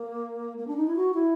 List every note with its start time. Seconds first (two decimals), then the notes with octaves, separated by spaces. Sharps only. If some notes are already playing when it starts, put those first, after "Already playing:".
Already playing: A#3
0.58 A#3
0.67 D4
0.77 D#4
0.87 E4
0.96 F#4
1.14 E4